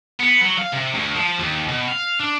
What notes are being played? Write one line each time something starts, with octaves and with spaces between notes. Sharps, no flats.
B3
F#3
F5
C3
D2
F3
D#2
B2
F5
D4